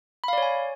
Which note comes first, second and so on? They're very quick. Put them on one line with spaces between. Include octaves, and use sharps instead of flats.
B5 F5 D5 C#5 G#5